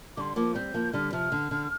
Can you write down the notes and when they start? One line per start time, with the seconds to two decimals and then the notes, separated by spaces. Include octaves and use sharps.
0.17 D3 G3 C6 D6
0.36 F3 A#3 D6
0.55 G3 C4 G6
0.74 F3 A#3
0.93 D3 G3 F6
1.13 C3 F3 F6
1.32 D3
1.51 D3